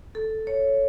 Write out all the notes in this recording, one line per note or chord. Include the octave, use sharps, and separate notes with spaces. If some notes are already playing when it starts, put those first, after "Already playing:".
A4
C#5